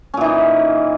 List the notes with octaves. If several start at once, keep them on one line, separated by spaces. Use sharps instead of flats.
A#2 E3 C#4 D#4